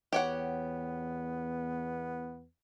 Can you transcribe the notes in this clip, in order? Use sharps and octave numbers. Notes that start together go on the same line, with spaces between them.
E2 B3 G4 C#5 F#5